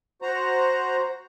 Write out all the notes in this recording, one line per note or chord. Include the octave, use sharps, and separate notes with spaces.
F#4 C5 A#5